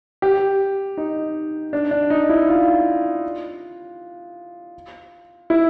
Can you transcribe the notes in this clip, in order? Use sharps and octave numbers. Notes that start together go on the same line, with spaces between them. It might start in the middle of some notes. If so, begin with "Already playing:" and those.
G4
D#4
D4
D4
D#4
E4
F4
E4